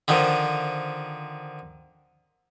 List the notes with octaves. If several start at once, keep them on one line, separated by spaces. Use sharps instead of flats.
D3 D#3 F3